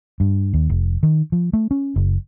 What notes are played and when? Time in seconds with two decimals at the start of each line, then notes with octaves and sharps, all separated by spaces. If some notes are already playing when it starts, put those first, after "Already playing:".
0.20 G2
0.53 D#2
0.70 F1
1.03 D#3
1.32 F3
1.53 A3
1.71 C#4
1.96 F#1